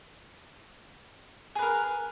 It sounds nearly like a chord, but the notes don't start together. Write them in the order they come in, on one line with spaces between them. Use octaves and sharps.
G#4 B4 A#4